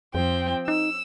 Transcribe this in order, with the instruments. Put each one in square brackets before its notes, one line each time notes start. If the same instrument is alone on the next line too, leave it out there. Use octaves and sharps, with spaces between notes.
[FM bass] F2 [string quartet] F3 C4 G5
[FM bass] D#4 [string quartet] E6